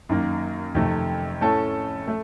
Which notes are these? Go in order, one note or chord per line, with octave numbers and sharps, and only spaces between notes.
F#2 D#3 A#3
F2 C3 D#3 A3
A2 A3 C#4 A4
A3